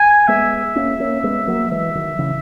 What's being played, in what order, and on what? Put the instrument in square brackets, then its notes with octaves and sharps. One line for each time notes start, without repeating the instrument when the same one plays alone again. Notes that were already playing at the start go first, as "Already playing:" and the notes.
Already playing: [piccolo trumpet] G#5
[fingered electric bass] G#3 B3 [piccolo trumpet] E5
[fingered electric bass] A#3 C#4
A#3 C#4
G#3 B3
F#3 A#3
[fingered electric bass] E3 G#3 [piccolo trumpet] E5
[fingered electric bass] D#3 F#3
C#3 E3